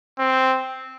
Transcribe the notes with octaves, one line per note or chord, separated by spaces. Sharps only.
C4